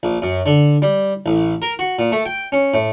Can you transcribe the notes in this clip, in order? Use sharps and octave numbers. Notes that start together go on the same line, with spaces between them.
A#1
F#2
D3
G3
A1
A#4
F#4
A#2
A3
G5
C#4
A2